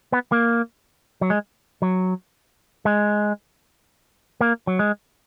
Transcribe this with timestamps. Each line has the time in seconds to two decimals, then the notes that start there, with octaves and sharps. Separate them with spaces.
0.12 B3
0.32 A#3
1.21 F#3
1.30 G#3
1.82 F#3
2.85 G#3
4.41 A#3
4.67 F#3
4.79 G#3